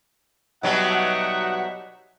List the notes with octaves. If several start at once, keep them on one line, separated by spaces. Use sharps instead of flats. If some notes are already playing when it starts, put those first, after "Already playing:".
B2 F#3 G3 D#4 E5 F#5